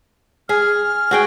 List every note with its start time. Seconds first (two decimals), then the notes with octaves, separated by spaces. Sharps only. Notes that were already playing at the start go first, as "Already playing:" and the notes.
0.49 G#4 F6
1.11 F#4 G#4 G5